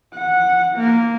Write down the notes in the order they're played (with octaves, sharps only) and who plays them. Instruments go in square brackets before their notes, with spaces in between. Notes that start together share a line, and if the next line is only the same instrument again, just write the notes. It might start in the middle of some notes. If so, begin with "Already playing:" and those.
[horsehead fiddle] F#5
A#3